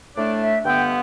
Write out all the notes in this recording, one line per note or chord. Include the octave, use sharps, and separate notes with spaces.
A2 A3 D4 D5
E5
G2 D3 B3 G5